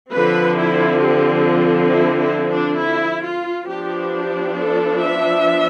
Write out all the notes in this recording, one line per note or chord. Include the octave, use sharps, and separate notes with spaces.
D3 F3 C4 B4
E4
G4
F4
E4
E4
D4
E4
F4
F3 B3 D4 G4
G4
A4
E5